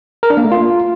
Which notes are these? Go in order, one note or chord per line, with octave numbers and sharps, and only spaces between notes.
A#4
D4
A#3
A3
F4